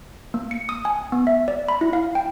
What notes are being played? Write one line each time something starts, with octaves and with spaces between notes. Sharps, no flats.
A#3
C#7
D#6
G#5
B3
E5
D5
B5
E4
F5
G5